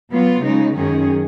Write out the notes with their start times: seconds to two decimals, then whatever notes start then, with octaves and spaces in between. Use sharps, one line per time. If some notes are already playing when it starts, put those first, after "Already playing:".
0.11 F#3 B3 F4
0.42 C#3 G#3 D#4
0.73 F#2 D#3 F#3 C#4 G#4